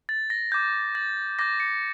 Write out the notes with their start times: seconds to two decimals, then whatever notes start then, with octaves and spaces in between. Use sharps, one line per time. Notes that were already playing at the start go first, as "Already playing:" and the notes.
0.09 A6
0.30 A#6
0.52 D6 G6
0.95 A6
1.39 D6 G6 A#6
1.60 C#7